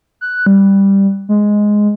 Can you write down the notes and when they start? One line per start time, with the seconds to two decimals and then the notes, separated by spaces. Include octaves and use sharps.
0.21 F#6
0.46 G3
1.29 G#3